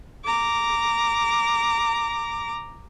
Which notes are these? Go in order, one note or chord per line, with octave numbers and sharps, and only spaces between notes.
A#5 D6